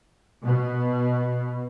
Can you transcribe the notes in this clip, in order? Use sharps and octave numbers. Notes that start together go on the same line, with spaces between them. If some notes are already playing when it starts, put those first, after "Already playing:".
B2